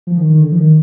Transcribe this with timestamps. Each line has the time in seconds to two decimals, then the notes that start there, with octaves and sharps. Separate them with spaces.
0.07 F3
0.17 D#3
0.30 D#3
0.40 D3
0.52 F3
0.57 D#3